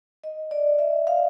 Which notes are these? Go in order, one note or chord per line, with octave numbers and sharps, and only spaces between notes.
D#5
D5
E5
F5